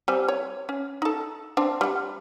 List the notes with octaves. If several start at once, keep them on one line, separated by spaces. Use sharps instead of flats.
G3 C4 G#5
C#5
C#4
D#4 A4
C4 D4
G3 F#5